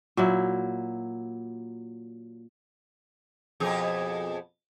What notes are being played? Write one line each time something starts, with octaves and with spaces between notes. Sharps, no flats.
A#2 F#3 E4
F2 B2 G#4